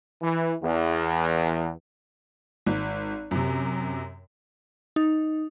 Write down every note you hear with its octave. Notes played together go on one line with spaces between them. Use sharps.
E3
E2
G#1
F#2 C3
D#4